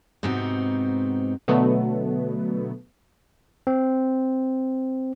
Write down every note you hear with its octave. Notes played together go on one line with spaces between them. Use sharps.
G#2 C3 B3 C4 D#4 F#4
B2 D3 F#3 A3 B3
C4